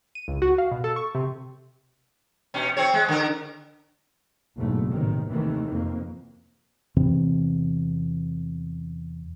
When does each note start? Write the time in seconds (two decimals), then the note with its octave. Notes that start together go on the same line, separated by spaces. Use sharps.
0.15 D#7
0.28 C#2
0.42 F#4
0.58 F5
0.71 B2
0.84 A4
0.96 C#6
1.15 C3
2.54 B2 C#4
2.77 C4 C#5
2.94 G#3
3.08 D3 A#4
4.56 F#1 B1 E2 G#2 C#3 A3
4.88 A1 C3 D#3
5.29 D#2 C3 D#3 E3 A3
5.71 F2 A#3
6.96 E2 C3 E3 C4